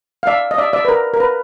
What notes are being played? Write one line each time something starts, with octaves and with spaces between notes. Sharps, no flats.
F5
D5 E5
D#5
D5 E5
D5 E5
B4
A#4
A#4
B4